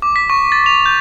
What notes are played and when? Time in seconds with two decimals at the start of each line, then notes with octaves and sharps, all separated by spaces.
0.02 D6
0.16 B6
0.30 C#6
0.52 A6
0.66 F7
0.86 G6